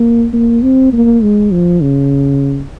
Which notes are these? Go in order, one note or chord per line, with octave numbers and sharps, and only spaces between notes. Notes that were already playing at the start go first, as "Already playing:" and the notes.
Already playing: A#3
A#3
C4
A#3
G#3
F3
C#3